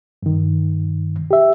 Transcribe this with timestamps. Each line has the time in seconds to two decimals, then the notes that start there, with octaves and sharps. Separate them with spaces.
0.23 G2 D#3
1.31 G4 E5